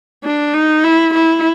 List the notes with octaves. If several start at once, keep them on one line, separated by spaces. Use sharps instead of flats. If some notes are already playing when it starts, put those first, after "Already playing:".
D4
D#4
E4
E4